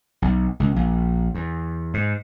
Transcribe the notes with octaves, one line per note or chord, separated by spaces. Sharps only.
B1
C#2
A#1
E2
G#2